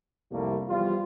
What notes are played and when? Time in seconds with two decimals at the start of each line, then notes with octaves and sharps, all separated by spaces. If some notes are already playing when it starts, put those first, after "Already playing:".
0.32 C2 F2 C3 G3 A3 A#3
0.69 E2 F3 G3 F4